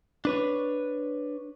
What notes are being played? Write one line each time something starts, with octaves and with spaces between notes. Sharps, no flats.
D4 B4 C#5